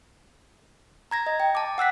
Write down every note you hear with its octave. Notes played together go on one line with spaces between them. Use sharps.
A#5 G#6 A#6
D#5
G5
A5 D6
F#5 E6 F#6 B6